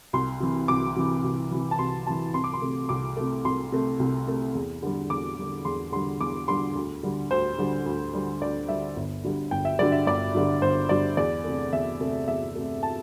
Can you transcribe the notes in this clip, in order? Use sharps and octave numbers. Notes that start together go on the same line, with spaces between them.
C2 C6
C3 E3
C2 D6
C3 E3
C2
C3 E3
A5
C2 C6
C3 E3 A5
C2 C6
D6
C6
C3 A3
C2 D6
C3 A3
C2 C6
C3 A3
C2
C3 A3
E2
D3 G3
E2 D6
D3 G3
E2 C6
D3 G3 C6
E2 D6
D3 G3 C6
D2
D3 G3
D2 C5
D3 G3
D2
D3 G3
D2 D5
D3 G3 E5
G1
G2 D3 G3
G1 G5
E5
G2 D3 G3 D5
E5
G1 D5
G2 D3 G3
G1 C5
G2 D3 G3 D5
E2 D5
C3 A3
E2 E5
C3 A3
E2 E5
C3 A3
A5